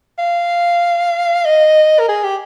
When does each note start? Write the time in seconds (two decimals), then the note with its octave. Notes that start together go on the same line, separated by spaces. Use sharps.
0.19 F5
1.45 D#5
1.99 A#4
2.09 G#4
2.24 G4